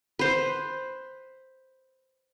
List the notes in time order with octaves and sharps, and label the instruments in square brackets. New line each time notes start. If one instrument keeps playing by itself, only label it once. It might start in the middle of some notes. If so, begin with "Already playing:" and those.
[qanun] B4 C5